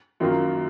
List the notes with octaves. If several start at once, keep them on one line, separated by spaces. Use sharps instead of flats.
F#2 D#3 F#3 A#3 F4